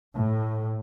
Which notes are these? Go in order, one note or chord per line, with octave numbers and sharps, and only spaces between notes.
A2